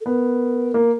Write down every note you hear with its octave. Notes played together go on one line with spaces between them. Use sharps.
A4
B3 A#4
A#3